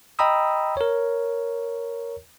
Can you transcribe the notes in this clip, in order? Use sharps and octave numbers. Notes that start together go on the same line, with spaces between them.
D#5 G5 A#5 B5 D#6 E6
A#4 C#5